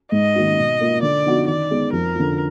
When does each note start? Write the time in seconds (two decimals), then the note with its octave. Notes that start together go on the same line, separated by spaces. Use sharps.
0.12 G#2 D#5
0.35 D#3 A#3 D#4 F#4
0.58 B2
0.80 A#3 F4
1.02 D3 D5
1.25 F3 B3 D#4 F#4
1.47 D#3 D5
1.71 G#3 B3 D#4
1.92 F2 A#4
2.15 D3 F3